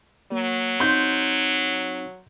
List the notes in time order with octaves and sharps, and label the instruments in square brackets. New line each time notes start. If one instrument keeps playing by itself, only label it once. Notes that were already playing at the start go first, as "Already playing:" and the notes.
[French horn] F#3 [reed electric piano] A#3
[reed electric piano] C4 D#4 [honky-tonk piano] C6 G6